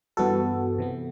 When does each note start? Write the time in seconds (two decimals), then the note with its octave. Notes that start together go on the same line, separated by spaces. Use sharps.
0.17 G2 E3 B3 F#4 A4
0.78 C3 E3 B3